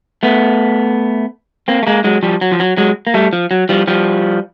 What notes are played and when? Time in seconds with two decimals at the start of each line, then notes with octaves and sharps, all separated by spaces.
0.23 A3 B3
1.68 A#3 C4
1.83 A3
1.87 G#3 A#3
2.04 F#3 G#3
2.23 F3 G3
2.41 F#3
2.52 F3
2.60 F#3
2.77 F#3 G#3
3.07 A#3
3.14 G3 A3
3.33 F3
3.51 F#3
3.69 F3 G3
3.87 F3 G3